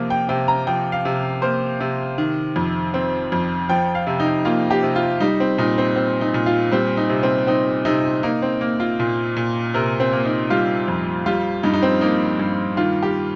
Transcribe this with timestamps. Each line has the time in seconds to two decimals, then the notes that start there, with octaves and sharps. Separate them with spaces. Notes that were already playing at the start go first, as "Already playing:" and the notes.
Already playing: C3 F3 A#3
0.10 G5
0.29 C3 G5
0.48 A#5
0.67 F3 G5
0.92 F5
1.05 C3
1.42 A#3 C5
1.80 C3
2.18 D#3
2.56 F2
2.94 C4
3.32 F2
3.69 F3 G5
3.95 F5
4.07 C3
4.20 D#4
4.45 A#3 F4
4.71 G4
4.83 C3
4.96 F4
5.20 G3 D#4
5.40 C4
5.58 A#2 D#4
5.78 C4
5.96 C4
6.21 D#4
6.34 A#2
6.46 F4
6.72 G3 C4
6.97 D#4
7.10 C3
7.23 C4
7.47 C4 D#4
7.85 C3 D#4
8.23 A#3 D#4
8.42 C4
8.61 A#3
8.80 F4
9.00 A#2
9.37 A#2
9.74 C3 A#4
10.00 C4
10.13 A#3
10.25 D#4
10.50 G3 F4
10.88 F2
11.26 G3 F4
11.63 G2 D#4
11.74 D#4
11.83 C4
12.01 A#3 D#4
12.39 G2
12.77 D#3 F4
13.03 G4